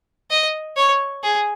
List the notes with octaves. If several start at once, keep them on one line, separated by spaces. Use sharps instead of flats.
D#5
C#5
G#4